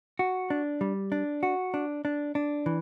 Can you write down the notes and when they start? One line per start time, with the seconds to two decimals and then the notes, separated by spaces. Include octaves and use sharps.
0.19 F#4
0.50 D4
0.81 G3
1.12 D4
1.43 F#4
1.74 D4
2.05 D4
2.35 D4
2.66 E3